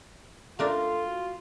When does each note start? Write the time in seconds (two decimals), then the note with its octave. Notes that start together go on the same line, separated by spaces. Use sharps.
0.59 A3 D4 F4 A4 A#4
1.07 F#4